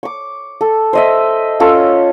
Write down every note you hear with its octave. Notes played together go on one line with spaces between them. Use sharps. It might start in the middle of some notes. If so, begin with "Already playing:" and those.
C#6 D6
A4
C5 D#5 E5
C#4 F4 A4 C#5